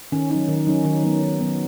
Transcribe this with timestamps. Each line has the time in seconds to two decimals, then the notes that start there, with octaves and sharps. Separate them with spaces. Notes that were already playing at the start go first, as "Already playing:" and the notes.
0.12 D#3 C#4
0.30 F#3 C#4 D#4
0.48 D#3
0.67 F#3 C#4 D#4
0.84 D#3 D#4
1.03 F#3 B3
1.21 D#3
1.40 F#3 B3